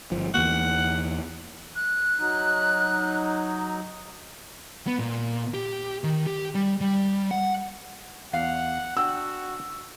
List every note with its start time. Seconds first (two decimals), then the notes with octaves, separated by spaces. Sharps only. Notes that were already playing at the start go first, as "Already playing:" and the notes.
0.12 G1 C#2 F3
0.34 E2 A#3 F#5
1.76 F#6
2.18 F#3 D#4
4.87 B3
4.99 A#2
5.54 G4
6.04 D#3
6.26 G4
6.55 G3
6.81 G3
7.31 F#5
8.33 E2 F5 F#5
8.97 D4 F#4 F#5 G5 E6